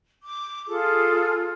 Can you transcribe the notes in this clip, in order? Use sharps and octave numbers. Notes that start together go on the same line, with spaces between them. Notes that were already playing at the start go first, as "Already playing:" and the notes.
D6
F4 G#4 A4